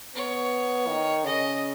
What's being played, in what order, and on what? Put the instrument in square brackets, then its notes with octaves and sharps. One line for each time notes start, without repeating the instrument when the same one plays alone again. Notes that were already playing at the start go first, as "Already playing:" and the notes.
[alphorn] B3 [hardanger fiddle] C#5
[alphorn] D#3
[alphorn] C#3 [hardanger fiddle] D#5